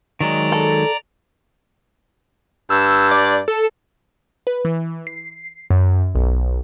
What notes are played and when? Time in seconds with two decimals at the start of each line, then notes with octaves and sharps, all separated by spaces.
0.21 D#3 F#3 G#3 D5 A#5
0.52 A4
2.70 G2 E6
3.11 D5
3.48 A4
4.47 B4
4.65 E3
5.07 C7
5.70 F#2
6.15 B1